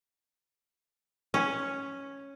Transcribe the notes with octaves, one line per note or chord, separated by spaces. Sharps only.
C#4